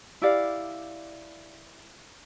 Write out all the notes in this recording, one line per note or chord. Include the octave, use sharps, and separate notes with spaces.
E4 G4 D5 F5